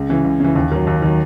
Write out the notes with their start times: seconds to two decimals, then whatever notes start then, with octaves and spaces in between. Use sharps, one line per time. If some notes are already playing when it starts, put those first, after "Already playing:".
Already playing: C#2
0.09 C#3 E3
0.24 C#2
0.40 C#3 E3
0.56 D#2
0.71 D#3 F#3
0.87 D#2
1.02 D#3 F#3